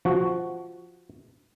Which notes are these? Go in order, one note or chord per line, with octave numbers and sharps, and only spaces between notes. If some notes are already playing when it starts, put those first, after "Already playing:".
F3 F#4